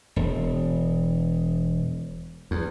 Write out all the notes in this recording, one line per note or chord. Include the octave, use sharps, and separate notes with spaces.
E1
E2